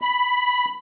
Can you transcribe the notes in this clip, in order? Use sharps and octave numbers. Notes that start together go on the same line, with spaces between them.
B5